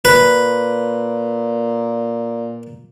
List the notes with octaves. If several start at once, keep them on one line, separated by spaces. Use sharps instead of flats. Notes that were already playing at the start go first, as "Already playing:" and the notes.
A#2 B4